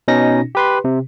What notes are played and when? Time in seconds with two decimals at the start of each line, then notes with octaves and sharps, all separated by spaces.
0.08 B2 C#4 D#4 A#6
0.55 G4 B4 C6
0.84 C3